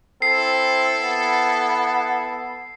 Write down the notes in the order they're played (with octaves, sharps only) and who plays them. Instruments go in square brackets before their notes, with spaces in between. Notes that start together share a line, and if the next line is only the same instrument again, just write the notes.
[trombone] C4 [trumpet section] E4 A4 [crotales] C7
[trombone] B3